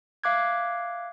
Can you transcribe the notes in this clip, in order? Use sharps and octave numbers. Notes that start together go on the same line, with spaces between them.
E5 F5 D6 F#6 G#6